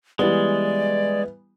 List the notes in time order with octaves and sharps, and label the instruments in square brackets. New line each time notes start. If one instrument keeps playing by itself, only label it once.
[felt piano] E3 G3 B3 [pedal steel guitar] G#3 [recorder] D5